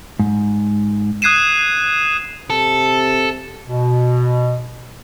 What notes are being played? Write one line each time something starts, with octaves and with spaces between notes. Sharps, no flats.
G#2
D#6 F#6 G#6 C7 D#7 E7
C3 A4
B2